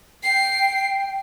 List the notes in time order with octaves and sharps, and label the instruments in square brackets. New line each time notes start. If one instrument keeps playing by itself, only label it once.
[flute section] G5 [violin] C7